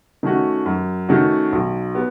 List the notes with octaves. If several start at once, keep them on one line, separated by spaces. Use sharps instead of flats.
D#3 A3 C#4 F#4
F#2
D#3 A3 C#4 F#4
B1
B3